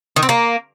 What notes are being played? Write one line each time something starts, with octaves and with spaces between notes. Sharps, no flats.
D#3
C4
A#3